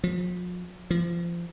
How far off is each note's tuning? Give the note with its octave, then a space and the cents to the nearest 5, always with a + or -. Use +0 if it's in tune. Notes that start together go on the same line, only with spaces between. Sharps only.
F3 +40
F3 -25